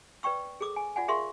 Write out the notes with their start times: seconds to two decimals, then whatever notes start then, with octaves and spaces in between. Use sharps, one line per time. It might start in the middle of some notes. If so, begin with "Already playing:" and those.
0.23 B4 D5 G5 C#6 E6
0.61 G#4 A4 D6 E6
0.76 G#5
0.96 F4 D5 F#5 G#5
1.08 G#4 A#4 E5 F5 C6 C#6